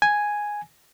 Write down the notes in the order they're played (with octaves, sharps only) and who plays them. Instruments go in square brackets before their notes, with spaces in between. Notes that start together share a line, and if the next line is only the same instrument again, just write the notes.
[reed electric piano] G#5